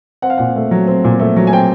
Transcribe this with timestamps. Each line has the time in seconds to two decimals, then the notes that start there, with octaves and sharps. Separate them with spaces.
0.22 C4 F#5
0.30 F5
0.38 A#2 F#5
0.56 A3
0.71 F#3
0.87 C4
1.04 A#2
1.19 A3
1.36 F#3
1.47 G#5
1.53 C4 G5